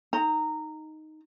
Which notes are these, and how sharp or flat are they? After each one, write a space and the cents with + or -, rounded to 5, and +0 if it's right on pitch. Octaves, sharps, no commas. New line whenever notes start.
D#4 +0 A#5 -15